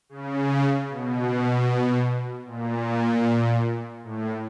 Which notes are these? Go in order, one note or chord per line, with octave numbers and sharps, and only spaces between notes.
C#3
B2
A#2
A2